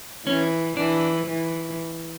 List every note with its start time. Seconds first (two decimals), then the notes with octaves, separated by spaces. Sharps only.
0.27 E3 C#4
0.77 E3 D4
1.27 E3